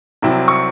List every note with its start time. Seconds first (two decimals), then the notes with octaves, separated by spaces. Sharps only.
0.22 C2 C3 F#3 C4 E4
0.48 C#6